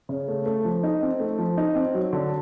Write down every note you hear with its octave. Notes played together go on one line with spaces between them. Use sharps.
C#3
A3
A3
F3
D#4
C4
A3
F3
D#4
C4
F#3
D3